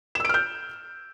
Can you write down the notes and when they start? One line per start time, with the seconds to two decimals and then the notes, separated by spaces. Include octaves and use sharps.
0.15 E7
0.20 E6
0.25 D7
0.29 F6
0.34 G6